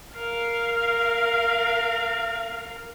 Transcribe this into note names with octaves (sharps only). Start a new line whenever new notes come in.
A#4 F5